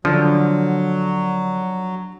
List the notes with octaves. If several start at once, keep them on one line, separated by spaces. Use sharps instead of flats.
D3 F3 F#3 D4